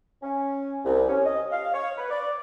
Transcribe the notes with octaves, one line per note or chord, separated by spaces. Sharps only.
C#4
C2
C#4
D#5
F5
C#5
B4
D5